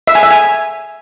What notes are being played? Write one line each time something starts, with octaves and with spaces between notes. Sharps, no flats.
E5
G#5
E5
G#5